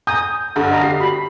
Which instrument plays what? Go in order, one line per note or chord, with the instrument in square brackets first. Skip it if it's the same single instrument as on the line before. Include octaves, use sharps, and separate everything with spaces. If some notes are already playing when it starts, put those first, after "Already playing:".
[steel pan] G#5 A#5 D#6 [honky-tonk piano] G6
[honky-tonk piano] G2 D3
[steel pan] A4 D#5 A#5
[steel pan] G4 [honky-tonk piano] C7
[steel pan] F#4 B5